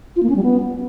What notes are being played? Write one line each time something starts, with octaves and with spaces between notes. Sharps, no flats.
F4
A#3
C#4
G3
B3